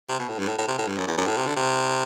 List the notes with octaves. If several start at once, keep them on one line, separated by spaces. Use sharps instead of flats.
C3
B2
A2
G2
A2
A2
C3
A2
G2
F#2
E2
F#2
A2
C3
D3
C3